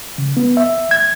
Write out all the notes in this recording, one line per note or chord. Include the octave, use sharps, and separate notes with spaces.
C#3
B3
E5
G#6